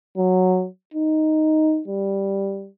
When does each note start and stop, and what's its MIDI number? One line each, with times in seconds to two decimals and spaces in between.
0.17 0.67 54
0.94 1.81 63
1.88 2.68 55